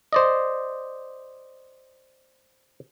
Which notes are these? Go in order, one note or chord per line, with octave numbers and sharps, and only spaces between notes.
C5 D5 D#5